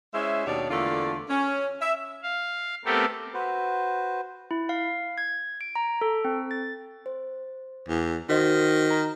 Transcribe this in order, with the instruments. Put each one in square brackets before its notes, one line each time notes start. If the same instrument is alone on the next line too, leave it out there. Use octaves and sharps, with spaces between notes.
[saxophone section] G#3 C#4 E4 C5 E5
D#2 B2 D4 G4 C#5 D5
E2 D3 A3 A#3 F4 D5
C#4
E5
[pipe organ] F5
A3 B3 C4 G4 A4 A#4
[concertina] F#4 B4 C5
[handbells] E4
F5
G#6
D7
A#5
A4
C4
A6
[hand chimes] C5
[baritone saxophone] E2
[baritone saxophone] D#3 [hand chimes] F#4 C5 D#5
[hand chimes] A#5